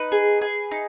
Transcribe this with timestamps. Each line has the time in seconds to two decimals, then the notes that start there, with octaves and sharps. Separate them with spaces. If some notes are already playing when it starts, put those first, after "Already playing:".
Already playing: D#4 B4
0.12 G#4
0.41 G#4
0.71 D#4